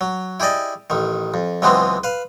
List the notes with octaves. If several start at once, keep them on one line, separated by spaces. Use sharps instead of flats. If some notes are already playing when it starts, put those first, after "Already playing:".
F#3
E4 G4 G#4 D5 D#5
A1 D#3
F2
C#2 E3 F#3 G#3 B3 C4
B4 F5